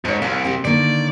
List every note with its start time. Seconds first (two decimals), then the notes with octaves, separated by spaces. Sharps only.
0.05 G#2 A4 C#5
0.22 C2 F5
0.44 C4 G4
0.65 D3 D#3 A#3 D5